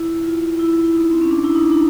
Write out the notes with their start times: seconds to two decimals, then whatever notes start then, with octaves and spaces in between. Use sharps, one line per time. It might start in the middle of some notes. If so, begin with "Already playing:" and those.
Already playing: E4
0.24 F4
0.59 E4
0.83 E4
0.95 D#4
1.11 C4
1.21 C#4
1.31 D4
1.44 E4
1.55 D#4
1.63 D4
1.72 D#4